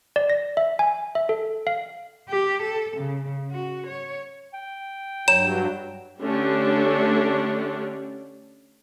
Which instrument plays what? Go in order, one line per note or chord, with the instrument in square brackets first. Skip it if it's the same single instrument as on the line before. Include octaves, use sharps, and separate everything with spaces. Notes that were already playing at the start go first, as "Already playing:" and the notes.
[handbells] D5
A#6
E5
G#5
E5
A4
F5
[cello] G4
A4
C#3
F#4
C#5
[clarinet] G5
[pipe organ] G2 F#3 [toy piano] C#5 A#5 [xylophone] E7
[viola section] D3 A3 C#4 D4 G4